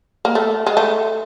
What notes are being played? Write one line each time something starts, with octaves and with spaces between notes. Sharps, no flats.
A#3
A3
G#3
A3